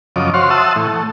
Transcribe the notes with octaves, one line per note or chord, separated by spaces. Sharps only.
F#2 C#3 F3 D#5 D6
F#4 C5 C#5 F5 C6
E5 F#5 A5 C6 D#6 E6
A2 E3
A3